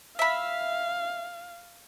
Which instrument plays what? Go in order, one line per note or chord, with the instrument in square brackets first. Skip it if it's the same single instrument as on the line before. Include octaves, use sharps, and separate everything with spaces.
[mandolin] E5 B5 [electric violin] F5